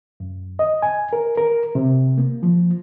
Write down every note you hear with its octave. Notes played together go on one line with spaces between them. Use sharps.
F#2
D#5
G#5
A#4
A#4
C3
A#3
F3